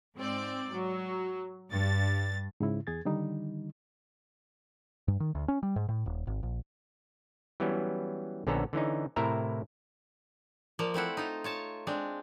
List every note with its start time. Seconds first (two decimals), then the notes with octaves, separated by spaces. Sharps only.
0.16 G#2 C4 D5
0.74 F#3
1.71 G2 A6
2.60 G#2 C#3 E4
2.87 E2 G#4 G#6 A6
3.05 D3 D#3 G3 D#4
5.08 G2
5.20 D#3
5.35 D2
5.48 C#4
5.63 G3
5.76 G#2
5.89 A2
6.06 D#1
6.27 G#1
6.43 A#1
7.60 E3 F#3 G3 B3 C#4
8.47 A#1 D3 B3 C#4 A4 A#5
8.73 D3 E3 C#4 D#4
9.16 A2 C3 E4 A#4 E5 A#5
10.79 F3 A#3 D5
10.94 A3 C4 E4 F#5
11.17 D#4 F4
11.44 F4 C#5 A5
11.87 G#3 C4 D4